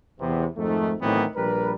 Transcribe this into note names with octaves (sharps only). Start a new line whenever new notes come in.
E2 C3 B3
F2 G#2 D#3 A3
A2 D#3 E3 F#3 B3 C4
A#1 G3 A#4 B4